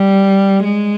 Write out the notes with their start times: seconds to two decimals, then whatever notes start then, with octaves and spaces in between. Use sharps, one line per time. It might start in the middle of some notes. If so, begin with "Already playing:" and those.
Already playing: G3
0.64 G#3